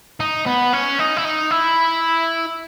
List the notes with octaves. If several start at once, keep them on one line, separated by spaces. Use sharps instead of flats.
D#4
B3
C#4
D#4
E4
D#4
E4